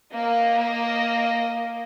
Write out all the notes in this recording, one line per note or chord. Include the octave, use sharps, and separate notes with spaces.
A#3 D#5